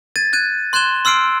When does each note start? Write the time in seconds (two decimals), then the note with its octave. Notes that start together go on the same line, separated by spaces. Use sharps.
0.16 G#6 A6 D#7
0.33 F#6 G#6 D#7
0.73 C6 F#6 G#6 E7 G7
1.05 C6 E6 F6 C7 D7